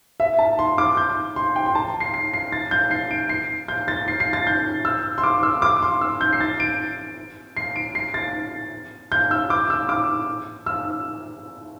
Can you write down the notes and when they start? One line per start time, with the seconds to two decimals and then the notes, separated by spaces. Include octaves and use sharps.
0.20 E5
0.39 A5
0.59 C6
0.78 D6
0.97 G6
1.36 C6
1.56 G5
1.66 C6
1.75 A5
2.00 C7
2.14 C7
2.33 C7
2.52 A6
2.71 G6
2.91 C7
3.11 D7
3.29 C7
3.68 G6
3.88 A6
4.08 C7
4.20 C7
4.33 A6
4.47 G6
4.85 E6
5.18 C6
5.23 D6
5.43 E6
5.62 D6
5.82 C6
6.01 E6
6.21 G6
6.33 C7
6.41 A6
6.60 D7
7.57 C7
7.76 D7
7.95 C7
8.14 A6
9.12 G6
9.31 E6
9.50 D6
9.70 E6
9.89 D6
10.66 E6